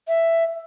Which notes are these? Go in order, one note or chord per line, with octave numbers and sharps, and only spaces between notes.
E5